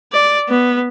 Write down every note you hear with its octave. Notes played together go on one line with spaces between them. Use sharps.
D5
B3